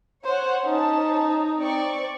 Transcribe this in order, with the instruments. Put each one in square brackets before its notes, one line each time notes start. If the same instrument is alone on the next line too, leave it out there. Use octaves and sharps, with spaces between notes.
[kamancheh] C5 [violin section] C#5 F#5
[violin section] C#4 C5 A5 [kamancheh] D#4
[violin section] C4 D5 C#6